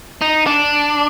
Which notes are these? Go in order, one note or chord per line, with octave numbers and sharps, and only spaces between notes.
D#4
D4